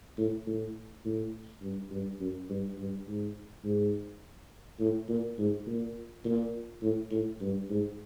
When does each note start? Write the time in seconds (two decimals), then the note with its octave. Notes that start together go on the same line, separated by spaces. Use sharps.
0.18 A2
0.46 A2
1.05 A2
1.62 G2
1.91 G2
2.20 F#2
2.49 G2
2.78 G2
3.07 G#2
3.64 G#2
4.80 A2
5.08 A#2
5.38 G#2
5.66 A#2
6.25 A#2
6.82 A2
7.11 A2
7.41 G2
7.70 G#2